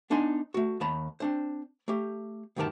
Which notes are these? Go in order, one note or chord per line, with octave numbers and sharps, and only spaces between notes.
B3 D4 D#4 G#5 C6
A3 F#4
D#2 A5 B5
C4 D4 C5
A3 G4
D2 G2 D#3 G4 A#4 A5